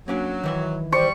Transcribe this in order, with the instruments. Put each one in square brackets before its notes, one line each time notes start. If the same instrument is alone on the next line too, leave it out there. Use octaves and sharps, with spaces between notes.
[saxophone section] F#3 [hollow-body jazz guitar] A#3 C#4 D4
[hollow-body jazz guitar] D#3 E3 E5
[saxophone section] G3 [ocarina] C5 [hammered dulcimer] C#6